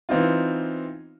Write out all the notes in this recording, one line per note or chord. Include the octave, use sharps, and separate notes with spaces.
E3 B3 C4 D#4 F4